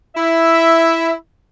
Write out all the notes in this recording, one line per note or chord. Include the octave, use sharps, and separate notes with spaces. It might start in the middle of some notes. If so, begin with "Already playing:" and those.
E4 E5